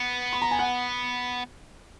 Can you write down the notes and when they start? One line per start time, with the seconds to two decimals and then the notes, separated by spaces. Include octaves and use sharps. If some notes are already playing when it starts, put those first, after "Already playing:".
Already playing: B3
0.33 B5
0.42 A#5
0.51 G#5
0.59 F#5